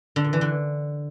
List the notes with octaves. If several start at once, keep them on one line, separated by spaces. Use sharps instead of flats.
D3
A#2
E3
D3